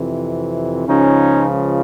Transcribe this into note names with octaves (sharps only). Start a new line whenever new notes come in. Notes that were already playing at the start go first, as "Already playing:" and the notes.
Already playing: F2 C3 E3
C#2 C#3 F3 C#4 D#4